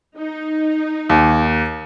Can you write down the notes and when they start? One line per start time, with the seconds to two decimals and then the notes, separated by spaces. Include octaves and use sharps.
0.17 D#4
1.09 D#2